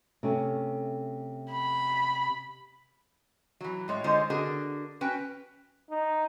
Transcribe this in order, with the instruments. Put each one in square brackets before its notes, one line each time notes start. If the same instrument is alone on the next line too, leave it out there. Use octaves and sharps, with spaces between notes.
[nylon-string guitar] C3 A3 C#4
[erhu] B5
[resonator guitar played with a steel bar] E3 F#3
A2 G#3 C#5
D3 G#3 D#4 F4 C5 C#5
D3 F#4 G#4 A#4
C#4 F#4 B4 G5
[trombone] D#4